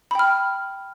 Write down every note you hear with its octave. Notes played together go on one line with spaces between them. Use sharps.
G5 B5 F6